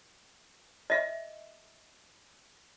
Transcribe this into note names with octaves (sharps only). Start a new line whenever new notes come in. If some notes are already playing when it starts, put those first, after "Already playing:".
D#5 E5